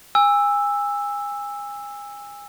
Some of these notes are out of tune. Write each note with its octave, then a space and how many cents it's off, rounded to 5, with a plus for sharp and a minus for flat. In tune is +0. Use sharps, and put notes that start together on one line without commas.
G#5 -30 E6 +0